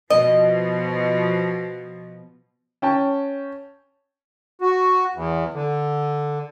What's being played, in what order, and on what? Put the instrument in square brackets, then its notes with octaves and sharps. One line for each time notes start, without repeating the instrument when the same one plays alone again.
[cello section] B2 F3 [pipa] D#5
[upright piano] C#4 G5 A5
[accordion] F#4
E2
D3